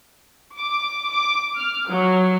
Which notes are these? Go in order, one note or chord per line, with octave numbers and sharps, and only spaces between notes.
D6
D6
F6
F#3